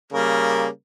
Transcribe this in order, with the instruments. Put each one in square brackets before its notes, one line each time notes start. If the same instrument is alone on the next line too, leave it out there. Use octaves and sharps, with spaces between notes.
[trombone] C#3 [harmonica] G3 A#3 A#4